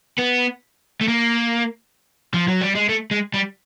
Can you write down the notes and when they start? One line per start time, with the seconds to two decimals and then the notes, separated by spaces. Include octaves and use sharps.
0.19 B3
1.01 A3
1.08 A#3
2.34 F3
2.48 F#3
2.61 G3
2.75 G#3
2.89 A3
3.11 G#3
3.34 G3